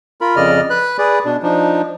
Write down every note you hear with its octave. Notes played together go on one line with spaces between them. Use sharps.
F4 A#4 B5
F2 C#3 D5 D#5 F6
B4 B5 F#6
G#4 B4 D5
B2 D4
F3 D4 D#4